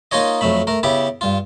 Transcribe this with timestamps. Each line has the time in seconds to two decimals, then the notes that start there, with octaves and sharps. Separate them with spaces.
0.11 A#3 D#4 F4 G#4 C#5 D#5
0.41 F2 F#3 A3 B5
0.67 A3 A#4
0.83 C#3 B3 E4 G4
1.21 G2 F4